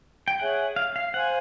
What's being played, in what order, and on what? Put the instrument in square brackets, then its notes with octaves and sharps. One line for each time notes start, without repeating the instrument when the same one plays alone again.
[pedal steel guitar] G5
[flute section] G#4 C#5 E5 G#5 [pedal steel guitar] F#5
[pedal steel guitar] F5
F5
[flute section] C5 F5 G#5 [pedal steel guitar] F#5